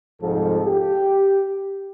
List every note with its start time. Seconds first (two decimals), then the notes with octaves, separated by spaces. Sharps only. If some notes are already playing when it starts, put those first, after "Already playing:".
0.21 C2 F2 G#2 F3 A4
0.64 G4